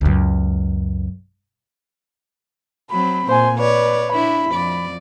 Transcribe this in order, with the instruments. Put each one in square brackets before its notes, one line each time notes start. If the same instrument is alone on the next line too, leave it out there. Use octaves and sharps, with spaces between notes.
[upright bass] C#2 F#2
[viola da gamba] F#3 C4 [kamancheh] B5
[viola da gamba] A#2 [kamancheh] C5 G#5
[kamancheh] B4 D5 [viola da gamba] C#5
[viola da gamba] D4 E4 [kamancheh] B5
[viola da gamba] F2 D5